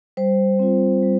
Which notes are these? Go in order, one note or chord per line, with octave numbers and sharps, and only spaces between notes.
G3 C5
C4 F4
G3